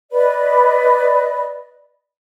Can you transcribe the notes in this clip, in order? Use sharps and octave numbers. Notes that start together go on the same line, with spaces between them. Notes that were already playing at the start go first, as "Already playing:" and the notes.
B4 D5 D#5 B5